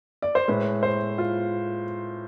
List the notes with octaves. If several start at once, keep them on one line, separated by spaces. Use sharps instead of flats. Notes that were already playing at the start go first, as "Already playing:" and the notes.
D5
C5
A2 G#3 B4
C5
F4